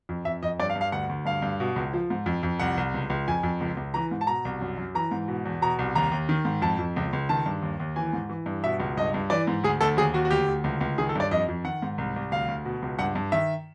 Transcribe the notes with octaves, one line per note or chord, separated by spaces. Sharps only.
F2
F2 E5
F2 D#5
G2 D5
F5
G2
F5
D2 F#5
D2
G2 F5
G2
B2
C#2
F3
G#2
F2
F2
C2 F#5
C2
C#2
C#2
F2 G#5
F2
C#2
C#2
E3 A#5
G#2
A5
B2 A#5
C2
F#2
F#2
E3 A#5
G#2
B2
E2
B2 A#5
C2
D#2 A#5
D#2
D#3
G#2
F2 A5
F2
C#2
C#2
D#3 A5
G2
D#2
D#2
E3 G#5
G#2
E3
G2
B2 E5
C#2
G2 D#5
G2
E3 D5
G#2
D2 G#4
D2 A4
D#2 G#4
D#2 F#4
F#4
D2 G4
D2
C#2
C#2
D#3 G#4
A4
G2 D5
F2 D#5
F2
D#3 F#5
G#2
C2
C2
D2 F5
D2
B2
C#2
G2 F#5
G2
D#3 E5